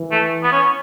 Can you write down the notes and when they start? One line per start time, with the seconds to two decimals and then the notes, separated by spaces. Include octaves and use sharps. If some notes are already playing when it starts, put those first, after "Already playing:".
Already playing: E3
0.11 A3
0.43 B3
0.52 C#4